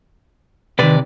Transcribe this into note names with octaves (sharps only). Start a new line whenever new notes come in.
C3 D#3 B4 D5